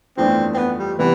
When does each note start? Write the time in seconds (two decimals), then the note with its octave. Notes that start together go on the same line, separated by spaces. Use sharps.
0.17 G1 F2 E3 A3 C4 D4
0.54 C4
0.58 B3
0.78 G3
0.99 C3 E3 G3 B3